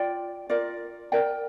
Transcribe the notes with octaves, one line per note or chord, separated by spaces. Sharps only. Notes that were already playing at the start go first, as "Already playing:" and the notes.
Already playing: F4 D5 G5
F4 A#4 D5
A#4 D5 G5